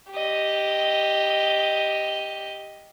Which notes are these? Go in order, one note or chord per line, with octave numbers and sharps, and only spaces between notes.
G4 D#5